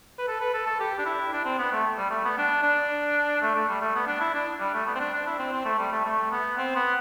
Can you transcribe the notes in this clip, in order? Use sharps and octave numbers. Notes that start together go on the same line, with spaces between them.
B4
A4
B4
A4
A4
G4
D4
E4
D4
C4
B3
A3
G3
A3
B3
D4
D4
A3
A3
G3
A3
B3
D4
E4
D4
G3
A3
B3
C4
D4
D4
E4
C4
C4
A3
G3
A3
A3
B3
C4
B3